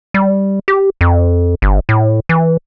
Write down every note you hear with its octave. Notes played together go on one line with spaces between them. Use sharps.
G3
G4
F2
G1
A2
E3